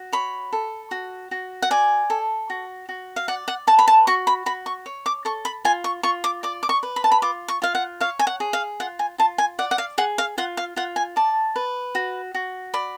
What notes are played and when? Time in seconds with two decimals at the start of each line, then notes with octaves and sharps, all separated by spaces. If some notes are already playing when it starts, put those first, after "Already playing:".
Already playing: F#4
0.13 C#5 B5
0.53 A4
0.91 F#4
1.31 F#4
1.62 F#5
1.71 D5 G#5
2.10 A4
2.50 F#4
2.89 F#4
3.16 F5
3.28 D5 F#5
3.48 F#5
3.67 B4 A5
3.79 B5
3.88 A5
4.07 F#4 C#6
4.27 B5
4.46 F#4 B5
4.66 C#6
4.86 C#5
5.06 D6
5.25 A4 C#6
5.45 B5
5.65 F4 G#5
5.84 C#6
6.03 F4 C#6
6.24 D6
6.43 D5 D6
6.63 D6
6.69 C#6
6.83 B4
6.96 B5
7.04 A5
7.12 B5
7.22 F4 D6
7.48 C#6
7.62 F4 F5
7.75 F#5
8.00 C#5 F5
8.19 G#5
8.27 F#5
8.40 G#4
8.53 F5
8.80 F4 F#5
8.99 G#5
9.18 F4 A5
9.38 G#5
9.59 D5 F#5
9.71 F#5
9.78 F5
9.98 G#4 F#5
10.18 F5
10.38 F4 F#5
10.57 F5
10.76 F4 F#5
10.96 G#5
11.16 D5 A5
11.56 B4
11.95 F#4
12.34 F#4
12.74 D5 B5